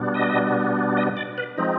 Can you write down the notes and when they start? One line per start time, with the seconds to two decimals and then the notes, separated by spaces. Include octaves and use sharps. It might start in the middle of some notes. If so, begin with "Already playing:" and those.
Already playing: B2 G3 B3 D4
0.14 D#5
0.97 D#5
1.17 D5
1.38 B4
1.57 F3 G#3 C4 D#4